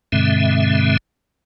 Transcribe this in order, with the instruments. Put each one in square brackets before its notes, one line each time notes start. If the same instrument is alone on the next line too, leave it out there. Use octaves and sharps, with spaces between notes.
[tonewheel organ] G2 B2 D3 G#3 C4 E5